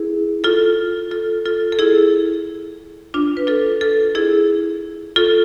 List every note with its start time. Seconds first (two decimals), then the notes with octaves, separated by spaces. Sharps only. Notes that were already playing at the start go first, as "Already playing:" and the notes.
Already playing: E4 G#4
0.44 F4 A4
1.11 F4 A4
1.45 F4 A4
1.72 A4
1.79 E4 G#4
3.14 D4 F4
3.37 B4
3.47 F4 A4
3.81 F4 A4
4.15 E4 G#4
5.16 F4 A4